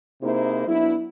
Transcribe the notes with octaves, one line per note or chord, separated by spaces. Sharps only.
C3 A#3 D#4 E4 G#4 C5
F#3 B3 D4 E4